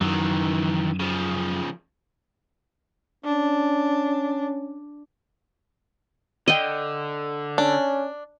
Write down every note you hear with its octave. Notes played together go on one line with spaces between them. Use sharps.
F#2 D#3 E3
C#3 F3
C#4 D4
D3 D#5 G5
C#4 D4